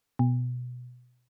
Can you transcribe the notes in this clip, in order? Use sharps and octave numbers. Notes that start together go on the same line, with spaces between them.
B2